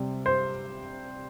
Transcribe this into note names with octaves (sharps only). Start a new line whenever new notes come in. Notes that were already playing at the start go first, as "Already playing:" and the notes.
Already playing: C3 G3 C4
C5